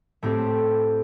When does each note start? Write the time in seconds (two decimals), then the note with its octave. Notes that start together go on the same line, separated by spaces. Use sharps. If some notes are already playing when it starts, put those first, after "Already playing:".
0.22 A2 A3 C4 G4